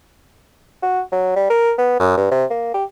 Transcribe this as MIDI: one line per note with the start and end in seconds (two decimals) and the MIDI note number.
0.83 1.01 66
1.12 1.35 54
1.36 1.47 55
1.50 1.73 70
1.78 1.98 59
2.00 2.17 42
2.18 2.29 43
2.32 2.45 48
2.50 2.71 58
2.74 2.84 67